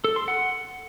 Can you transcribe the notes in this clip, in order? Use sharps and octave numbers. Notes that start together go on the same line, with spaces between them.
A4
C6
F#5